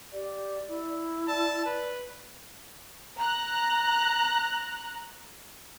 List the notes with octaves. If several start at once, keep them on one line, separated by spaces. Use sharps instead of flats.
G4 D5
E4
D5 A5
B4
A#5 F#6